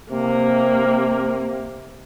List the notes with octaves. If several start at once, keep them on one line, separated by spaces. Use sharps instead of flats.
C3 A#3